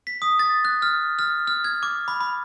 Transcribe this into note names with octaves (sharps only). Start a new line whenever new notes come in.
B6
D#6
A6
F#6
F6
F6
F6
G#6
D6
B5
B5